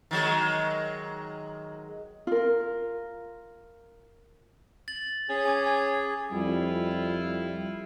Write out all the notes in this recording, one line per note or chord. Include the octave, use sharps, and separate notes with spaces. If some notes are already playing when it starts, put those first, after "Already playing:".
D#3 F#3 G#3
F4 A#4
A6 F#7
C#4 G#4
G#5 D6 G#6
G#5
F2 G3 E4 F4